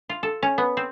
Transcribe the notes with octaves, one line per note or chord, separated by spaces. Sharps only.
F4
A4
C#4
B3
C4